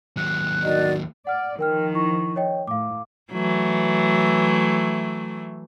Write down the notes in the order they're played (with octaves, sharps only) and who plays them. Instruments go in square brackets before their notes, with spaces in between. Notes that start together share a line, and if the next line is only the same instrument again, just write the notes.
[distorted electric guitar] D#2 F#3 [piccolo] F#6
[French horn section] D#3 F#4 D#5 [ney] D5
[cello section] D5 [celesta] F#5 F6
[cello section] D#3 F3 [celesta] A#4 G5 F6
[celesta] E4 C#6
C#5 D#5 G5
[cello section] A2 [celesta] F5 D6
[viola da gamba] E3 F#3 A3